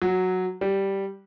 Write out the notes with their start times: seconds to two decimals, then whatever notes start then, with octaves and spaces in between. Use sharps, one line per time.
0.02 F#3
0.61 G3